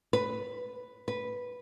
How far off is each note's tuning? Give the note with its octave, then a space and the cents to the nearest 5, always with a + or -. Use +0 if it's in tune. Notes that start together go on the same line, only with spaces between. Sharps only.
B4 +5
B4 -5